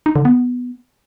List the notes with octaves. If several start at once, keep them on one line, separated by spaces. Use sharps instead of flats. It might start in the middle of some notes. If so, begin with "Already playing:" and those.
D#4
D3
B3